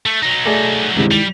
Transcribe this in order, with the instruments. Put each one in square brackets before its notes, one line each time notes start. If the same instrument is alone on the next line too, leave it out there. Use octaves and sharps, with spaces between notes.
[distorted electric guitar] A3
F#3 D#4
[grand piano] A3 G#4 D5
[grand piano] G2 C3 [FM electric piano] D#3 G#3 E4
[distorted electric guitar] G3 [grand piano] F7